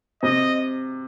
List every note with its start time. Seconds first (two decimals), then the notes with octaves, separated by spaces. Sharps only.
0.23 C3 D#5